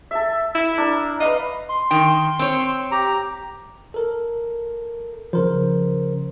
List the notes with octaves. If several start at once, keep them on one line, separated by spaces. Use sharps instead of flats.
A4 E5
E4
D4 A#4
B4 D#5 F5
C6
D#3 G5
C4 C#5
G4 A#5
A4 A#4
C#3 F3 A#4 C5